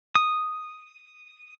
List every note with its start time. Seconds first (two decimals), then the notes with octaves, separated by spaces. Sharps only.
0.15 D#6